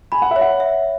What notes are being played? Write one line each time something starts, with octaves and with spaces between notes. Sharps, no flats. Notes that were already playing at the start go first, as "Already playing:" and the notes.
G#5 B5
F#5
E5
C#5
F#5
E5